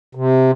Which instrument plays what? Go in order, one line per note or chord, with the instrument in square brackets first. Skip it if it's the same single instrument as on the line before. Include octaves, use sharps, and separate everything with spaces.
[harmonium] C3